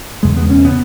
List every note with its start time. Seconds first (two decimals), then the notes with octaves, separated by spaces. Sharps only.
0.22 E1 E2 C#3 G#3
0.36 B3
0.50 C#4
0.65 C#3 B3